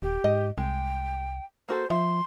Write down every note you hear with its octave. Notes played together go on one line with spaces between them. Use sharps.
D#1 G4
G#2 D#5
C2 G#3 G5
A#3 F#4 A4 C5
F3 E5 C6